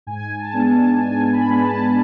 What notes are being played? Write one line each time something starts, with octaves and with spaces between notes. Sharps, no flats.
G#2 G#5
A5
G#3 B3 D4
A5
G#2 G#5
B5
G#3 B3 D4
A5